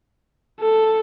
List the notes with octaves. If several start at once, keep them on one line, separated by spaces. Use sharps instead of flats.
A4